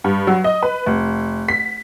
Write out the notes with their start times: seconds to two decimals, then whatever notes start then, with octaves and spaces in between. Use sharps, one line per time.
0.04 G2
0.27 F#3
0.44 D#5
0.63 B4
0.86 F1
1.49 B6